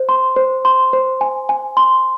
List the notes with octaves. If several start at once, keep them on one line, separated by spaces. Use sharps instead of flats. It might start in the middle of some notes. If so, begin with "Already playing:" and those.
Already playing: C5
C6
C5
C6
C5
G#5
G#5
C6